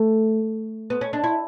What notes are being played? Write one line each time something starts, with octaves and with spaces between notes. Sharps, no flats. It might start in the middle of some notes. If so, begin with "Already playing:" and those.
Already playing: A3
B3
C#4
D4
E4